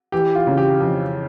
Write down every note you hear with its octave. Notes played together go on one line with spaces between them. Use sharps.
E3 G4
F4
C#3
G4
F2